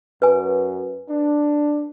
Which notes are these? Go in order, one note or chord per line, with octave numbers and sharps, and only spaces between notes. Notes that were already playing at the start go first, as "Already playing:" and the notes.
F#2 B4 G#5
D4